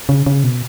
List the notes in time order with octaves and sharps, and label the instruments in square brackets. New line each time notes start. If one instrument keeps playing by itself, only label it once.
[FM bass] C#3
C#3
B2